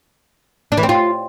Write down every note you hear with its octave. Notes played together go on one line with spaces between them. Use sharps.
D4
E3
C4
F4